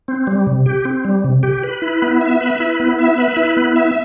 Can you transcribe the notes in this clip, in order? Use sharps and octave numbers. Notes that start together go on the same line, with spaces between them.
C4
G3
C3
G4
C4
G3
C3
G4
B4
E4
B3
E5
B4
E4
B3
E5
B4
E4
B3
E5